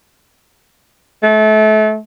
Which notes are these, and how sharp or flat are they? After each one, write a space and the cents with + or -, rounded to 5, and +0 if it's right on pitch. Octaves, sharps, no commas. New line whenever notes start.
A3 -30